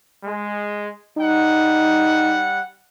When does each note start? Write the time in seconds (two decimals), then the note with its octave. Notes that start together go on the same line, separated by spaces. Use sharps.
0.24 G#3
1.17 G3 D#4 F#5